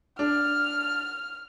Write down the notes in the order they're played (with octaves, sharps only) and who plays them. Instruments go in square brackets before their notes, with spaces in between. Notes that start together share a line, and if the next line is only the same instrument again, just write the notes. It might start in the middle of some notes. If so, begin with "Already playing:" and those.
[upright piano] D4 [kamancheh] F6